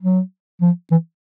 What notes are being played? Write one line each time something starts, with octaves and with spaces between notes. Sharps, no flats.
F#3
F3
E3